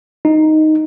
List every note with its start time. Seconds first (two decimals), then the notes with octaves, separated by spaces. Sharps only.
0.25 D#4